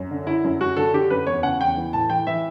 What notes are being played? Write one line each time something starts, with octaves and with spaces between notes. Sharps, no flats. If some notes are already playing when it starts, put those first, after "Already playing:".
Already playing: F#2
D3
D3 E4
F#2
F#2 F#4
D3 A4
D3 G4
F#2 B4
E2 C#5
C#3 F#5
E2 G5
E3
A2 A5
E3 G5
E3 E5